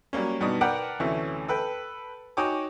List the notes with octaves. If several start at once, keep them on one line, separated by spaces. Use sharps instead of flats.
F#3 G3 A#3 C#4
G2 B2 D4 D#4
A#4 B4 D5 F#5 G5 A5
D2 C3 E3 A3 C#4
A4 B4 G5
D#4 F#4 C#5 G5 G#5 D6